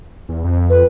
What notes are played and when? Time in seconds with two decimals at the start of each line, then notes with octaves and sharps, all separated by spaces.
0.29 E2
0.44 F2
0.70 B4